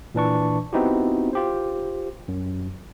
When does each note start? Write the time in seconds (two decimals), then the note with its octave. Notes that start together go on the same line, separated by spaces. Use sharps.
0.15 A#2 E3 D4 C#6
0.73 B3 C4 D#4 E4 F#4 G4
1.33 F4 G4 C5
2.28 F#2